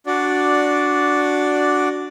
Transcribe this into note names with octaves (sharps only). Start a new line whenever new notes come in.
D4 F#4 D5